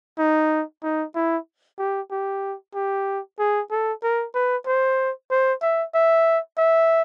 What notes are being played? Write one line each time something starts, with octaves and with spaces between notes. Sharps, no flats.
D#4
D#4
E4
G4
G4
G4
G#4
A4
A#4
B4
C5
C5
E5
E5
E5